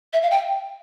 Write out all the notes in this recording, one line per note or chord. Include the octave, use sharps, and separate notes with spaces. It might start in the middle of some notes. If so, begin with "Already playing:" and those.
E5
F5
G5